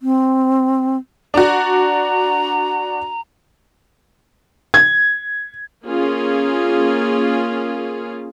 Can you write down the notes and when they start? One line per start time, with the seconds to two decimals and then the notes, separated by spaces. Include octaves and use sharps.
0.02 C4
1.34 D4 F#4 A#5
4.74 G#6
5.86 A#3 C#4 F4 G#4